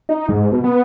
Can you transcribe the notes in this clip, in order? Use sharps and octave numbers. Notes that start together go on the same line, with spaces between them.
D#4
G#2
B2
B3